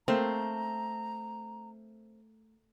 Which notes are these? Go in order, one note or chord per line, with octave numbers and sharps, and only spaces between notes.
A3 A#3 C4 A#5